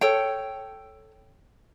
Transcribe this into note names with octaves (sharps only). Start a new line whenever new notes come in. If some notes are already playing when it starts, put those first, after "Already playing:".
A4 C#5 G5